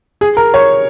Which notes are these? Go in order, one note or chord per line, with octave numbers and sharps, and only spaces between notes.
G#4
A#4
C#5